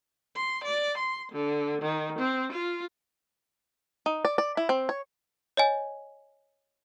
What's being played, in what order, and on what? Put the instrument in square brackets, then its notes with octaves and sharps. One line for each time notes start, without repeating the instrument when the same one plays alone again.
[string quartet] C6
D5
C6
D3
D#3
C4
F4
[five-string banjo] D#4
D5
D5
E4
C4
C#5
[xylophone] C#5 D#5 G#5